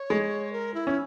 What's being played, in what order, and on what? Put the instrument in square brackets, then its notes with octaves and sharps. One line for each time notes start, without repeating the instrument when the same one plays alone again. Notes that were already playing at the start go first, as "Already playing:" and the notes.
Already playing: [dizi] C#5
[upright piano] G#3
[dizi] A#4
E4
[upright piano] C#4